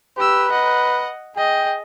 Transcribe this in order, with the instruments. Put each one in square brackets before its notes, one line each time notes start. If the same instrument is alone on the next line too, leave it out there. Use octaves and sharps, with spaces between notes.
[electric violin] G4 E6 [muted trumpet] B4
[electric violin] D#5 F#5
[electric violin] G#4 D#5 [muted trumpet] G5